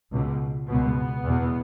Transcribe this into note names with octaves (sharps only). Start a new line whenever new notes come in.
C#2 B2
C#2 B2 B3
E2 B2